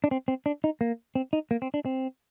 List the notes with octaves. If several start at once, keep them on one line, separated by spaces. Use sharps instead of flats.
D4
C4
C4
D4
D#4
A#3
C4
D#4
A#3
C4
D4
C4